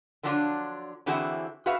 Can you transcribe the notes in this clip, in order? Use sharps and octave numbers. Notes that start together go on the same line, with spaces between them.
D3 F3 F#3 D4 E4 F4
D3 E3 C4 E4 F#4 G#4
F#4 G#4 B4 E5 F5